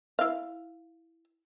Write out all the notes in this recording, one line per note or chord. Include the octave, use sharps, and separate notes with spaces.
E4 F5